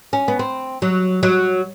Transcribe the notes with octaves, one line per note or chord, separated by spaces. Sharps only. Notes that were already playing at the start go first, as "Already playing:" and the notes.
C#4
B3
C4
F#3
F#3